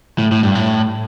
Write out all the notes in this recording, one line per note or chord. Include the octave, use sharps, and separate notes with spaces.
A2
A2
G2
A2